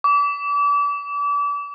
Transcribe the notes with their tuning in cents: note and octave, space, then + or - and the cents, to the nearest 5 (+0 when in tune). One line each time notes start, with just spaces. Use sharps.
D6 -35